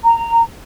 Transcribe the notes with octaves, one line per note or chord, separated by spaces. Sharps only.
A#5